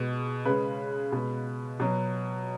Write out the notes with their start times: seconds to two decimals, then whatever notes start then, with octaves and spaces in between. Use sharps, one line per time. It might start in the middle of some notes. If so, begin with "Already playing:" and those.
Already playing: B2 G#3
0.45 C#3 G#3 B4
1.12 B2 G#3
1.80 B2 F#3